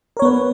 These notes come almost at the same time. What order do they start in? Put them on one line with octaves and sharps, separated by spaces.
A#4 C#5 B3 B4